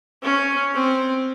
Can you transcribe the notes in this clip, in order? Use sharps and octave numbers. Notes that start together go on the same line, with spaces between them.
C#4
C4